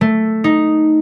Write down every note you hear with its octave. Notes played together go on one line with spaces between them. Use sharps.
A3
D#4